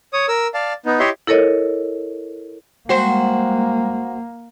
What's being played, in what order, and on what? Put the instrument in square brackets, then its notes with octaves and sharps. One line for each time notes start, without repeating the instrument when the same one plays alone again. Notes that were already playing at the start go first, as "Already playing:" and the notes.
[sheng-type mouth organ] C#5 D#6
A#4 E6
D5 F5 A5
B3 D#4
E4 G4 C#5 D#5 E5 C6
[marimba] E4 A4 A#4 C#5 D#5
[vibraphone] G3 G#3 [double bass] A#3 [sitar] F#4 C5